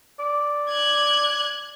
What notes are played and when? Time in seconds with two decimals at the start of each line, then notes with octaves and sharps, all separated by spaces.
0.19 D5
0.69 F#6 G#6